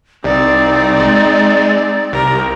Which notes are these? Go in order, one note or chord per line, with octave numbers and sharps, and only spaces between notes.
C2 C4 D#4 D5
G#3
C2 G4 A#4